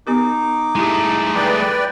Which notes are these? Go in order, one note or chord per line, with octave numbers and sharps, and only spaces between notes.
B3 D#4 G4 A#4 D6
G#3 A3 E4 G4
B4 D5 G5